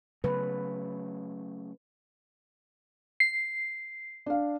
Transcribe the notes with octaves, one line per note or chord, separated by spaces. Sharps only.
C#3 F#3 A3 B4
C7
D4 F5